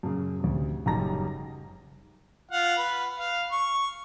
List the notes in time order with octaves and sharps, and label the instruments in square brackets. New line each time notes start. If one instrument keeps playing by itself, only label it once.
[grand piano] F#2 C#3
D2 C3
F#1 G3 D#4 A#5 A#6
[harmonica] F4 F5 F#5
B4
F5
C#6